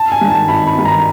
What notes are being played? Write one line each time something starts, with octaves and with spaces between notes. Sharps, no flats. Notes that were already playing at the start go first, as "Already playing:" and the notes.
Already playing: A5
G#5
G2 D#3
A5
G#1 B5
B5
G2 D#3
A#5